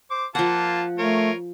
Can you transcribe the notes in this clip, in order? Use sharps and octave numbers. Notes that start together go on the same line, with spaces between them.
C5 D6
F3 A#3 F4 F#5 A5
A3 F4 A#4 C#5